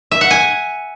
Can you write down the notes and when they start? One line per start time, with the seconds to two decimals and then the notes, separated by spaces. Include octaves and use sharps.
0.11 E5
0.21 F#5
0.31 G#5